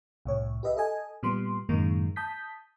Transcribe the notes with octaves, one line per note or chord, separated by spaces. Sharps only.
C2 A2 C#5
G4 B4 D#5 E5
A4 D#5 G#5
A#2 G3 B3 C6
F#2 A2 D#3 G#3 A#3
A5 D#6 G6 B6